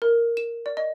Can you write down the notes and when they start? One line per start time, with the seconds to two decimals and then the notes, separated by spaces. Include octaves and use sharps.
0.02 A#4
0.37 E7
0.66 D5
0.77 D#5